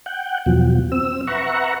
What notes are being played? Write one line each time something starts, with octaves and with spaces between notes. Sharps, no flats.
F#5 G5
E2 B2 F3 F#3
C4 E6
B4 E5 F#5 A#5 C#6